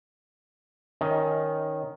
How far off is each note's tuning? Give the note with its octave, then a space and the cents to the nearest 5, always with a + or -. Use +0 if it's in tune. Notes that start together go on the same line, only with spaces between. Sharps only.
D#3 +0 C#4 +0 D#5 +15